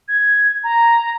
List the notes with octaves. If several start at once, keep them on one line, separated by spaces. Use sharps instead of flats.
G#6
A#5